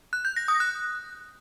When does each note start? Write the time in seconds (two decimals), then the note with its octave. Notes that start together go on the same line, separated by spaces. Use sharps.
0.13 F#6
0.25 G6
0.36 A#6
0.48 D#6
0.60 F#6